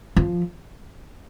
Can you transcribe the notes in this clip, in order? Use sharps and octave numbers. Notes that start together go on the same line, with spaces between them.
F3